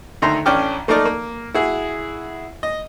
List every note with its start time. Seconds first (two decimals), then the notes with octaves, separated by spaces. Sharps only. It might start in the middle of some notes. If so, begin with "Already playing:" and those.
0.22 D2 D#3 E5 A#5 C6
0.46 A1 C#4 D4 G5 D6 F6
0.88 A3 A#3 D#4 A4 A#4 D5
1.05 A#3
1.54 E4 F#4 G#4
2.63 D#5